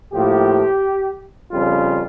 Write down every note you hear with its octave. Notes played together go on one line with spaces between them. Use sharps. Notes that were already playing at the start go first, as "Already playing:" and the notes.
A2 F3 A#3 G4
F2 C#3 G3 F4